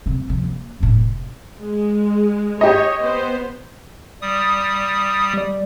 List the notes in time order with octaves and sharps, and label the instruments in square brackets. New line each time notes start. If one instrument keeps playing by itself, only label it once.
[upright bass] C3 C4
F3
A#3
F1 A2
[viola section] G#3
[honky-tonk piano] G4 D#5 [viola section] C#5
[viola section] B3 C5
[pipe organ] G3 D#6
[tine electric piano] G3 D5